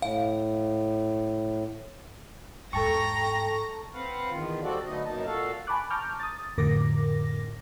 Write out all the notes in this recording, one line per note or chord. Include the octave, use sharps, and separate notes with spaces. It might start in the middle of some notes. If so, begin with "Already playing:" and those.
A2 F5
E2 G#2 A4 G5 A5 A#5 C#6
C4 B4 F5 F#5
E2 D#3 F4
G3 C4 F#4 A4 D5
D3 F#3 A3 B3 D#4 D#5
F#2 B2 A#3 D#4 A5
A#2 F#4 A4 F5
G#5 A5 B5 C#6 D6 F#6
A5 A#5 C#6 D6 F6 G6
D#6 A6
F2 A2 D3 A#4 D6 A#6